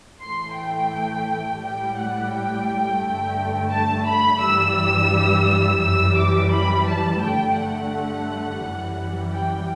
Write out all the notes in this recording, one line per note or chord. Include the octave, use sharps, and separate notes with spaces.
A2 E3 A3 C6
G5
A2 G3 G5
F#5
G5
G2 D3 A3
A5
B5
G2 E3 G3 E6
F#2 E3 G3 E6
D6
B5
A5
G2 D3 A3 G5
F#5
F#2 E3 G3
G5